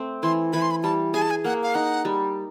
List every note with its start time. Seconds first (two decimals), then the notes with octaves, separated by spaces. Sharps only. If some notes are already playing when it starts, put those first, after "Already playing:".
Already playing: A3 C4
0.23 E3 C6
0.53 E3 B5
0.62 C6
0.71 B5
0.83 G3 A5
1.14 G#4 G#5
1.22 A5
1.30 G#5
1.44 A#3 F#5
1.63 F5
1.75 D#4 F#5
2.05 G3